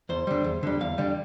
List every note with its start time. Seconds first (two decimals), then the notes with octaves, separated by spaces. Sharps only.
0.09 E2 C5
0.27 D3 G3
0.44 E2
0.63 D3 G3
0.81 E2 F5
0.98 D3 G3